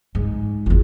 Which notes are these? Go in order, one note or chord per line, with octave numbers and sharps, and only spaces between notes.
G#2
G1 E2 F4